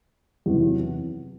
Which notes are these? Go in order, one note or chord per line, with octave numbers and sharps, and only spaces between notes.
E2 C3 D#3 F#3